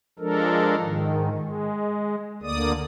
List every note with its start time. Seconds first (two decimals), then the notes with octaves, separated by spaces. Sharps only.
0.19 F3 G#3 D4 A4 A#4
0.81 G#2 D#3
1.35 G#3
2.42 D2 D3 A#3 D5 D#6